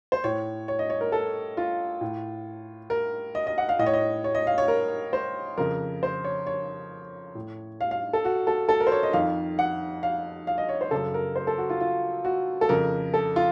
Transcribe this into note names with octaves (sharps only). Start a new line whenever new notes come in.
C5
A2 C#5
C#5
D#5
C#5
A#4
A4
F4
A2
A#4
D#5
D#5
F#5
F5
A2 D#5
C#5
D#5
C#5
D#5
F5
C#5
A#4
C5
F2 C#3 A#4
C5
C#5
C#5
A2
F5
F5
A4
F#4
A4
A4
A#4
C5
C#5
D#5
F2 D#3 F5
F#5
F5
F5
D#5
C#5
C5
F#2 C#3 A4
A#4
C5
A4
F#4
F4
F4
F#4
A4
F2 C#3 A#4
A4
F4